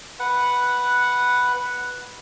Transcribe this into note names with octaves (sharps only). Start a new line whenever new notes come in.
B4 F#5